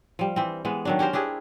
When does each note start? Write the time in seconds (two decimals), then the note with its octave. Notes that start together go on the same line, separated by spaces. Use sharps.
0.19 F3 G3
0.36 E3 C4
0.65 E3 G#3 B3
0.85 D#3 F#3 D4
0.99 C#4 G4 A#4 C5
1.13 D4 E4 G4 G#4